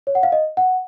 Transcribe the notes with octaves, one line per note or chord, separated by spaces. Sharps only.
C#5
F#5
F5
D#5
F#5